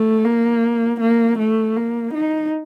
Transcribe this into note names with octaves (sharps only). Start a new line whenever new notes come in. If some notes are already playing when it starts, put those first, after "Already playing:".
Already playing: A3
A#3
A#3
A3
A#3
D#4